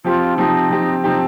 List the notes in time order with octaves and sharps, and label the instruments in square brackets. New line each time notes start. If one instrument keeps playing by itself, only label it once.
[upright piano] F3 C4 G4 [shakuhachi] F4
[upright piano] F3 C4 G4 [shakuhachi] D#4
[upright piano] F3 C4 G4
[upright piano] F3 C4 G4 [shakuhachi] D#4